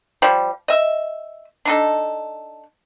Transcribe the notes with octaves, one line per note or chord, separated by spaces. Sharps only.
F3 G3
D#5 E5
D4 D#4 A4